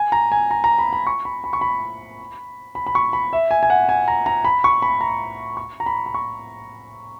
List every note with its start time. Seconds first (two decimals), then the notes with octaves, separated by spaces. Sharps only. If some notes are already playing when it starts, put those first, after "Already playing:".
Already playing: G#5
0.12 A#5
0.32 G#5
0.51 A#5
0.64 A#5
0.79 B5
0.93 B5
1.07 C#6
1.25 B5
1.44 B5
1.53 C#6
1.61 B5
2.75 B5
2.87 B5
2.95 C#6
3.13 B5
3.33 E5
3.51 G#5
3.63 G#5
3.70 F#5
3.89 G#5
4.08 A#5
4.26 A#5
4.45 B5
4.64 C#6
4.82 B5
5.01 A#5
5.57 C#6
5.80 A#5
5.86 B5
6.06 B5
6.14 C#6